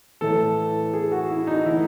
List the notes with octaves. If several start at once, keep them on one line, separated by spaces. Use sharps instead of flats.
A2 E3 A4
G#4
F#4
E4
D#4
A2 E3 E4